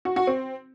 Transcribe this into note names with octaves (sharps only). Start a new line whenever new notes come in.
F#4
F#4
C4